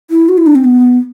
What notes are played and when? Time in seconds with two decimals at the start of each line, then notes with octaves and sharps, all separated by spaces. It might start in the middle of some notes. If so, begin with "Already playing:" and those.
0.10 E4
0.29 F#4
0.38 E4
0.46 D4
0.55 C4
0.64 B3